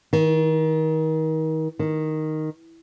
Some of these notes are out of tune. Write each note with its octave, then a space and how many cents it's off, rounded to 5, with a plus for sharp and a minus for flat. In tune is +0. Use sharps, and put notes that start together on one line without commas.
D#3 +30
D#3 +0